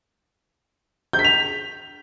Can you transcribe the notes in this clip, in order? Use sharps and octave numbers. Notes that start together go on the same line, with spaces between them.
G6
B6
F7